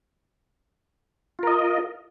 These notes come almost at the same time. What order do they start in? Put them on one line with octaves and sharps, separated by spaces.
F4 A#4 D#5